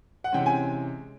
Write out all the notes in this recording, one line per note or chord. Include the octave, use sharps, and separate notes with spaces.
F#5
C3 E3 G#3 C#4 G5
G#5